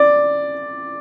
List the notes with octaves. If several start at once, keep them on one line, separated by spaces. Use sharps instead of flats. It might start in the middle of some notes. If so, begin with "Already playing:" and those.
Already playing: D5